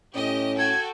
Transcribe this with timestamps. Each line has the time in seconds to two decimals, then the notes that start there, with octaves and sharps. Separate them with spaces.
0.15 A2 C#4 G4 D#5
0.59 F#4 A4 G5 G#6